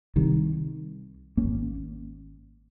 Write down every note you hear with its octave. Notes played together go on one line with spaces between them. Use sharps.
C2 C3 D#3 G3
G#1 G2 A#3 C#4